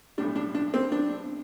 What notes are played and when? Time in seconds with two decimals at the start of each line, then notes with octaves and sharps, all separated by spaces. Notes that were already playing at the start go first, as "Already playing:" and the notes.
0.18 B1 A2 G3 D4
0.36 D4
0.55 D4
0.74 C4
0.92 D4